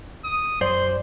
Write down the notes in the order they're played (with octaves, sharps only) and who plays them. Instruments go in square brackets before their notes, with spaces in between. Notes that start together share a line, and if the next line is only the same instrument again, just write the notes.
[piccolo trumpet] D#6
[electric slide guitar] F#2 C5 D5 [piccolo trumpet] C6